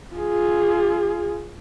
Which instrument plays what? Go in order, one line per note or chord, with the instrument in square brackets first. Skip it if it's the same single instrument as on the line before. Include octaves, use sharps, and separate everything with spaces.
[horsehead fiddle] F4 G#4